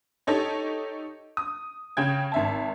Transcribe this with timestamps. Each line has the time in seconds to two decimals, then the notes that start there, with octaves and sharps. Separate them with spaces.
0.27 D#4 G4 A4 C#5 D#5
1.37 D#6
1.97 C#3 C#5 G5 G#6
2.32 G#1 E5 A5